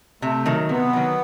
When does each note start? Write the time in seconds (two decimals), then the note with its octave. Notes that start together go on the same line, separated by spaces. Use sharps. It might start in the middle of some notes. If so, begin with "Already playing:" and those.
0.22 C3 A3
0.46 D#3 F#3
0.69 C3 B3
0.93 D#3 F#3